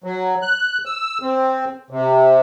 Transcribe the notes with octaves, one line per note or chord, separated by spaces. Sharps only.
F#3
F#6
E6
C4
C3